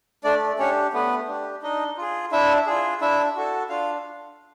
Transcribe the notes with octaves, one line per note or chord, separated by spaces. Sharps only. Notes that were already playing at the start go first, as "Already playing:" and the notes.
A3 D4 D5
C#4 D4 G4 C#5
A3 B3 B4
D4 G4
D4 D#4 D#5
F4 G#4
D4 E4 E5
F4 G#4
D4 E4 E5
F#4 A4
D4 F4 F5